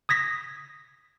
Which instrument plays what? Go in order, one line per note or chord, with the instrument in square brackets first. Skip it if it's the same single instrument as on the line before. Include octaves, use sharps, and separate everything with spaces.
[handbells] D#6 G#6 A#6 B6